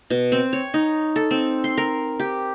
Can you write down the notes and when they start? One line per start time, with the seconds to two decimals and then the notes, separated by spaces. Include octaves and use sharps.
0.10 B2
0.32 C4
0.53 C#5
0.74 D#4
1.16 A4
1.31 C4
1.64 C6
1.77 A#4
2.20 G4